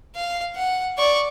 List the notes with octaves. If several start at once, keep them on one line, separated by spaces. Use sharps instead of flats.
F5
F#5
D5 C#6